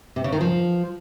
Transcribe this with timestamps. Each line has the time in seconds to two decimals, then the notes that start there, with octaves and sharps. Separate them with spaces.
0.16 C3
0.24 C#3
0.32 D#3
0.41 F3